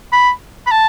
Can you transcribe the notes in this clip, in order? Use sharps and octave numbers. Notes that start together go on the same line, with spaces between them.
B5
B5
A5